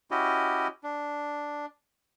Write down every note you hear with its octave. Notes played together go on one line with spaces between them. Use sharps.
C#4 E4 F#4 G4 D#5
D4